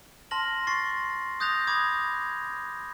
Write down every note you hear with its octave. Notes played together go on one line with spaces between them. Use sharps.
A5 C6 F6 A#6 F#7
C6 C#6 A6 C7
D#6 F#6 G6 A6 A#6 F7
B5 D6 D#6 G#6